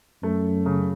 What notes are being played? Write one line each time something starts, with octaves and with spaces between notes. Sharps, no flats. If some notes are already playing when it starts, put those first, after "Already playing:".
F#2 A3
C#3